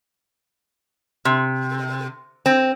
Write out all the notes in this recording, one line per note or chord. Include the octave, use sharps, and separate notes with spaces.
C3
C4